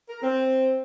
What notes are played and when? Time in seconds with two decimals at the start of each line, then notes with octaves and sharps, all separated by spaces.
0.09 A#4
0.22 C4